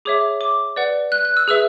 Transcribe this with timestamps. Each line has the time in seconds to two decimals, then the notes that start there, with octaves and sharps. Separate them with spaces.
0.05 G#4 C#5 E5 D6
0.41 D6
0.76 B4 D5 F#5
1.12 F#6
1.25 F#6
1.37 E6
1.48 G#4 B4 E5 E6